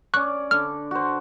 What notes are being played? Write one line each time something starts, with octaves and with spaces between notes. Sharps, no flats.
C#4 D5 C#6 F#6
D3 F6
F#4 C5